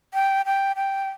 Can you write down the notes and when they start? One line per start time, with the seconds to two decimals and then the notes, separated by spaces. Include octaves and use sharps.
0.14 G5
0.46 G5
0.76 G5